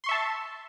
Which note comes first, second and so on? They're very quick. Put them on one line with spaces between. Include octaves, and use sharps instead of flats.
C6 C#6 E5 A5